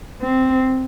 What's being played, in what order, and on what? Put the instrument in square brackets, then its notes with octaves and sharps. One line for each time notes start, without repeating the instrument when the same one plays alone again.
[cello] C4